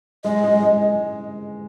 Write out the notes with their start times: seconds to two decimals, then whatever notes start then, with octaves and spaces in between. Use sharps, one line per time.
0.24 G#3 D#5
0.44 G#3
0.62 G#3